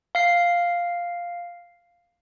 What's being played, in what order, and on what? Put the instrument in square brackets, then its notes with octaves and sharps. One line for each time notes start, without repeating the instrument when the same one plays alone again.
[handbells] F5 C7